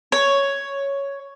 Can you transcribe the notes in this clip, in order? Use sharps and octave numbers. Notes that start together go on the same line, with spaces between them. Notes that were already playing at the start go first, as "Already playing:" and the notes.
C#5